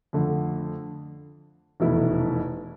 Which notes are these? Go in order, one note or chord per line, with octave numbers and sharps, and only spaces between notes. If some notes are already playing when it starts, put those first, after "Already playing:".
F2 D3 A3
F1 E2 B2 A3 E4